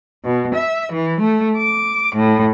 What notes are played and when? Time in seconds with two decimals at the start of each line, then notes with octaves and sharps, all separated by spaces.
0.24 B2
0.55 E5
0.92 E3
1.21 A3
1.58 D6
2.16 A2